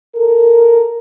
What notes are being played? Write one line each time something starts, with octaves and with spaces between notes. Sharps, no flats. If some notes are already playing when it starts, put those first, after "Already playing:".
A4 A#4